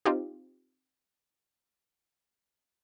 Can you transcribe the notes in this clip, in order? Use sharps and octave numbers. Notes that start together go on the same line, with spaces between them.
C4 D#4 F4 G4